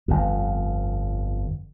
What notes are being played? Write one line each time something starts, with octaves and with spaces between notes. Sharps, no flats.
G1 F2